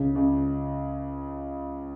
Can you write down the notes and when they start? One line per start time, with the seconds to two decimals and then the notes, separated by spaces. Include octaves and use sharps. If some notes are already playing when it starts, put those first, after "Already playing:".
Already playing: C#2 C#3
0.15 C#2 C#3